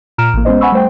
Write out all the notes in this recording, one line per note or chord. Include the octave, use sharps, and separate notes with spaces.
A#2 A#5 F6 D7 E7
A1 A#3
G#3 B3 C#4 C5 D#5
F#5 G#5 B5 C#6 E6
G3 A3 C5 G5